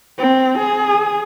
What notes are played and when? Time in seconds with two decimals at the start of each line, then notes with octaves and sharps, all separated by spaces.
0.18 C4
0.59 G#4